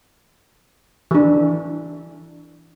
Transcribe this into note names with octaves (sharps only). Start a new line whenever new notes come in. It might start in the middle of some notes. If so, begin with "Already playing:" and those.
E3 D4